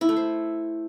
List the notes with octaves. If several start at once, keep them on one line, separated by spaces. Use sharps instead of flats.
E4
A3
C5